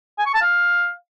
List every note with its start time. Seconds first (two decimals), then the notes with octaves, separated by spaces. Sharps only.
0.19 G#5
0.26 C#6
0.34 A5
0.42 F5